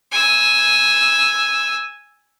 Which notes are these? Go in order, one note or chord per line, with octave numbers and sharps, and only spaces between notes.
G#5 E6